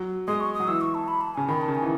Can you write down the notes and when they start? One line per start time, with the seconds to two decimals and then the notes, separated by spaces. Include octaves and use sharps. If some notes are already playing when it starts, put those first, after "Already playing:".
Already playing: F#3
0.28 G#3 D#6
0.40 C#6
0.54 D#6
0.60 F#3
0.68 E3 E6
0.81 C#6
0.95 A5
1.08 B5
1.21 A5
1.35 C#3 G#5
1.48 D#3 B5
1.61 A5
1.68 C#3
1.75 G#5
1.82 E3